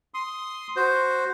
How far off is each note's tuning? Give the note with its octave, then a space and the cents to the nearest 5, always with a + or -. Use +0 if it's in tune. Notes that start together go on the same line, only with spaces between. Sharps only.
C6 +0 D#6 +5
F#4 +0 C5 +0